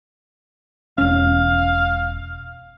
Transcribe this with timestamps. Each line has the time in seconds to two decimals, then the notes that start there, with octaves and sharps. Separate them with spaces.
0.98 E1 C#4 F5